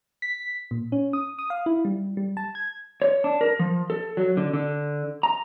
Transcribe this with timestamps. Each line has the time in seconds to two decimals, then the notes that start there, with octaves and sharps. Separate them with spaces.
0.22 B6
0.71 A#2
0.92 C#4
1.13 D#6
1.39 D#6
1.50 F5
1.66 E4
1.85 G3
2.17 G3
2.37 A5
2.55 G#6
3.02 C#5
3.24 D4
3.41 A#4
3.59 F3
3.90 A4
4.17 F#3
4.37 D3
4.53 D3
5.23 A#5